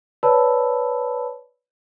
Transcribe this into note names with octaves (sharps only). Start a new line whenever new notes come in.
B4 C#5 D5 A5 B5 E6